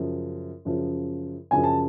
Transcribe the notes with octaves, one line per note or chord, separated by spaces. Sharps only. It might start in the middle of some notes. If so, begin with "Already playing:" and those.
Already playing: F#2 C#3 F3
F#2 C#3 F3
F#2 C#3 F3 G#5
A5